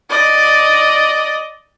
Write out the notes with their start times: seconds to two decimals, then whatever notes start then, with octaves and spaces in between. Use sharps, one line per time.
0.10 D5 D#5